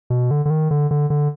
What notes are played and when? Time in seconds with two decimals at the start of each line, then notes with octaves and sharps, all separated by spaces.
0.10 B2
0.31 D3
0.45 D3
0.50 D#3
0.71 D3
0.91 D3
1.10 D3